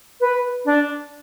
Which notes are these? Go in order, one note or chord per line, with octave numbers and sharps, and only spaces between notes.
B4
D4